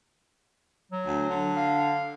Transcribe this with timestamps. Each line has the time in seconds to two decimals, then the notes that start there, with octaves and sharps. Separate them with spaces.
0.92 F#3
1.06 D2
1.30 D3
1.57 F5